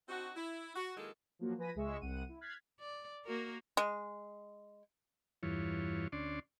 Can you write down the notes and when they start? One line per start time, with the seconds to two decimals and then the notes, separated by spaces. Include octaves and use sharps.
0.09 C4 D4 D#4 F#4
0.36 E4
0.76 F#4
0.97 D#3 F#3 G#3 A#3 E4 A4
1.39 F3 F#3 A#3 F#4
1.58 F3 B4 G#5 A#6 B6 D#7
1.75 C#2 G#3 E5 C#6 E6
2.01 C2 F#5 D#7
2.29 E4
2.41 F6 F#6 G#6 A6 B6 C7
2.80 D5
3.24 A#3 F#4 A#4
3.77 G#3
5.43 E2 G2 E3 F4 C#5
6.12 D2 C#4 D4 D5 C6